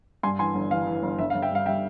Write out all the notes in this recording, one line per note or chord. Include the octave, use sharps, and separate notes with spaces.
G2 G#5 C6
E3 G#5 C6
G1
E3 F5
E3
G1
G1 E5
F5
G1
E5 G5
G2 F5
G3 E5 G5